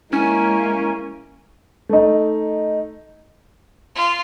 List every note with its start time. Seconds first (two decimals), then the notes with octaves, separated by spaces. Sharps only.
0.13 G#3 A#3 C#4 E4 G#5
1.89 A3 D#4
3.95 F4